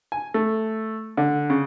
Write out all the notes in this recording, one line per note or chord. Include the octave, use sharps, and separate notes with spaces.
G#5
A3
D3
C#3